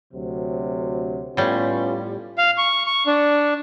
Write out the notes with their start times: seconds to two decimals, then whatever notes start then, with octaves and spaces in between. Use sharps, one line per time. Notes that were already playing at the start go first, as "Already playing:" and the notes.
0.14 D2 C3 F#3
1.37 A2 G3 B3 C#4 F4
2.38 F5
2.58 C#6
2.86 C#6
3.07 D4